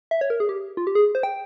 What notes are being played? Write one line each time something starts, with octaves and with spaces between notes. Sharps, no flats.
E5
C#5
A#4
G#4
G4
F4
G4
G#4
C5
G5